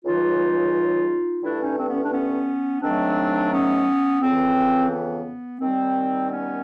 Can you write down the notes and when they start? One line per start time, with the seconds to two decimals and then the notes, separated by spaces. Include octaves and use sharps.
0.04 C#2 C#3 E3 G3 D#4 F4
1.43 G2 E3 A3 D4 E4
1.60 C#4 D#4
1.77 C4 D4
1.89 B3 C#4
2.03 D4
2.12 B3 C#4
2.81 G#2 D#3 F#3 A3 C4 D4
3.51 B3 C#4
4.20 F2 C#3 E3 C4
4.90 B3
5.59 D#2 D#3 G3 C4
6.29 B3 C#4